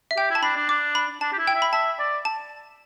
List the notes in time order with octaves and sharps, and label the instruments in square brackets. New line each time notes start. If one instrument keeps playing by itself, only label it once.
[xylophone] E5
[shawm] G4 [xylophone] G5
[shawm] E4
[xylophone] A5
[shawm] D4 [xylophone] B5
[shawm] D4
[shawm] D4 [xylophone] D6
[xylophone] B5
[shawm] D4 [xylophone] A5
[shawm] G4
E4
[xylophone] G5
[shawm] E5
[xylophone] B5
[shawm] E5 [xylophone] A5
[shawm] D5
[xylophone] A5